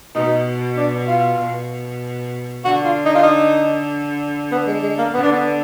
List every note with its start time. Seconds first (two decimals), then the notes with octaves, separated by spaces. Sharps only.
0.14 B2 D#4
0.77 D4
1.08 F4
1.39 B2
2.64 D3 F#4
2.84 F4
3.05 D#4
3.15 F4
3.23 D#4
4.52 B3
4.67 G#3
4.82 G#3
4.98 A#3
5.13 D3 B3
5.23 D4
5.32 B3